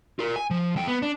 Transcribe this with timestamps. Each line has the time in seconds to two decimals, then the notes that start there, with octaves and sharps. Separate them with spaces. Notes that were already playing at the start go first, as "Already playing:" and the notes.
0.19 F4 A#4
0.36 G#5
0.51 F3
0.76 F2 G5
0.88 B3
1.02 D4